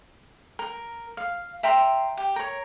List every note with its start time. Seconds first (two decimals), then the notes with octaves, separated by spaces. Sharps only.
0.59 A#4
1.17 F5
1.63 E5 G5 A#5 C6
2.17 G4
2.36 A#4 C#5